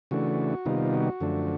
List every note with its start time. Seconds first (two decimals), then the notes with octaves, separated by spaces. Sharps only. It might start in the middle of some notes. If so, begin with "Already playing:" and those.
0.11 C#3 E3 A3 D4 F#4
0.65 C3 D#3 G3 B3 D#4 F4
0.94 F#4
1.20 F#2 D3 F3 A3 D4